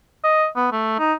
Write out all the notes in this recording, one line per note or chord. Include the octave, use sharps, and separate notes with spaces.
D#5
B3
A3
D#4